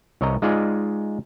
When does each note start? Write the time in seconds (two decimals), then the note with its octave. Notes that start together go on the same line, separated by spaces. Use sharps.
0.21 C2 C#5 D#5 A#5
0.42 G#3 D#4 F4 G#4 D5 F5